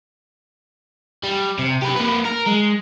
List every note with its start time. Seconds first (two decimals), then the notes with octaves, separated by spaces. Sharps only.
1.24 G3
1.59 C3
1.82 G4 B4
1.96 A#3 B4
2.25 A#4
2.47 G#3